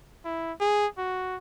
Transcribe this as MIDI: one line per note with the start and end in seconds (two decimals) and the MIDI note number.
0.25 0.52 64
0.60 0.86 68
0.98 1.36 66